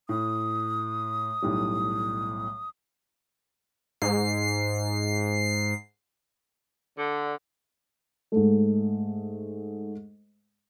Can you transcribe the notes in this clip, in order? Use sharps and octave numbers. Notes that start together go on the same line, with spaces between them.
A2 D#6
B1 A2 G3
G#2 C7
D3
G#2 A3